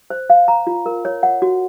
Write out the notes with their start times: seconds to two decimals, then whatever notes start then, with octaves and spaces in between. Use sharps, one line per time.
0.10 C5
0.30 F5
0.48 A#5
0.67 F4
0.86 A#4
1.05 C#5
1.23 F#5
1.42 F#4